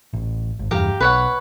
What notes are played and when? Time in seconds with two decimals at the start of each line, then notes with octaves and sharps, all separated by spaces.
0.13 A1
0.59 G#1
0.71 F1 E2 G2 G4 F5 A#5
1.00 B1 B4 C#5 F#5